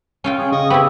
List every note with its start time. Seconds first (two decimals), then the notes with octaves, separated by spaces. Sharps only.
0.24 C#4 F4 G5
0.38 G#4
0.52 C#3 D#5 C#6 D#6
0.70 B3 C4 E4 G4 B5